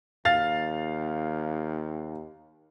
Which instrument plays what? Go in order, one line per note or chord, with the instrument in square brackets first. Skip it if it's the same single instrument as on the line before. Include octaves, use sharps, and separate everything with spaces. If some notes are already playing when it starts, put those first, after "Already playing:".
[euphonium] D#2 [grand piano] F5 A6